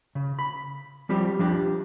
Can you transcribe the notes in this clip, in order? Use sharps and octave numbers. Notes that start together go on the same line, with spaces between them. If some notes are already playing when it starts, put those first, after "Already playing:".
C#3
B5
F3 G3 C4 G4
F3 D4 G4